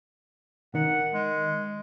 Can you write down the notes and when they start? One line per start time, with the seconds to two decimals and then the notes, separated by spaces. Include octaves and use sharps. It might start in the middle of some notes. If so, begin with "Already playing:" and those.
0.75 D#3 F#5
1.13 G#3